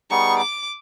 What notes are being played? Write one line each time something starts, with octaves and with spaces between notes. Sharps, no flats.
G3 B3 D#4 G#4 C#6
D6